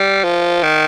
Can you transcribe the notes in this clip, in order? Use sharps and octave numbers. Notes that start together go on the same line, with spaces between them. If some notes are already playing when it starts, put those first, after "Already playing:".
Already playing: G3
F3
D#3